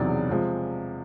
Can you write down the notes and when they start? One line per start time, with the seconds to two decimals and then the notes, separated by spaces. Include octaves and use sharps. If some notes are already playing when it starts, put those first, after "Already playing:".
Already playing: E1 E2 C3 D#3 F#3 D5
0.30 C3 F3 G#3